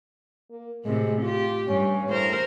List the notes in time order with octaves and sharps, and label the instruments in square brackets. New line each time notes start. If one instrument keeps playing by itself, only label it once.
[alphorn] A#3
[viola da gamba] A2 C3 [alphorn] G#3
[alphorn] F4 [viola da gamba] G4
[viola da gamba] G2 [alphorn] C#4
[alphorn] A2 [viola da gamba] A#4 C5